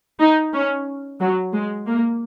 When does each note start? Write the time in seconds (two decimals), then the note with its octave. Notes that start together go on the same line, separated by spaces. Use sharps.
0.20 D#4
0.53 C#4
1.20 F#3
1.53 G#3
1.87 A#3